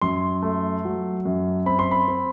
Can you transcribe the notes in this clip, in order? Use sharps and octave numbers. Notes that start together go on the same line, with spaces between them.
F#2 C6
A3
F#3
F#2
C4 B5
C6
B5
C4